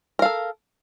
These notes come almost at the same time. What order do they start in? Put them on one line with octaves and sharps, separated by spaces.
A#4 F5 A4